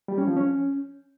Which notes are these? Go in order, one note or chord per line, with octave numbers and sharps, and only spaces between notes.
G3
C#4
F3
C#4